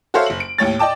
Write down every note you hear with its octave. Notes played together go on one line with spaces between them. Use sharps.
F#4 A4 C5 C#5 E5 F5
F#1 F#7
D7
D#2 A2 C#5 A6
D5 D#5 G5 A5 D6